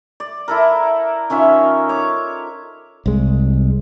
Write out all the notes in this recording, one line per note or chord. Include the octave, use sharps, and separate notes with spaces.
D5
E4 A4 A#4
D#3 C#4 F4 E5
C#5 D6
C2 G#3